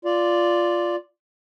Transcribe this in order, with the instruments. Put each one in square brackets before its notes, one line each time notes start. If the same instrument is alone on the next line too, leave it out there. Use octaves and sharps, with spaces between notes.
[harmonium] F4 D5